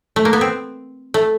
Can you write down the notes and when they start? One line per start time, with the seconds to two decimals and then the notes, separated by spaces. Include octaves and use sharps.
0.16 A3
0.25 A#3
0.33 B3
0.41 C4
1.14 A3